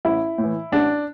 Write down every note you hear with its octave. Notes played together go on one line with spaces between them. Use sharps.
A1 E4
A2
E3
A1 D4